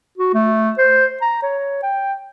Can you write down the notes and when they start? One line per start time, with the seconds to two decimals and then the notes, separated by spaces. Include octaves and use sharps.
0.18 F#4
0.34 A3
0.78 C5
1.22 A#5
1.43 C#5
1.83 G5